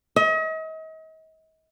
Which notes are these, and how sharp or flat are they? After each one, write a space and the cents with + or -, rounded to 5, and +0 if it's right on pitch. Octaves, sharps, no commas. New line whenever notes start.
D#5 +40